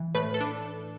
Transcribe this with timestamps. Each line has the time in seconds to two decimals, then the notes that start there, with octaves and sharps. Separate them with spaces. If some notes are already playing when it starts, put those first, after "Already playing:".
Already playing: E3
0.15 A2 B4
0.34 A4
0.40 D4